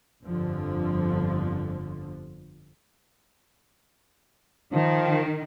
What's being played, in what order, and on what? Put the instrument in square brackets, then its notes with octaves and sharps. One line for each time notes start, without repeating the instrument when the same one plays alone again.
[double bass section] G1 F2 D3 F3
[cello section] D#3 [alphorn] F3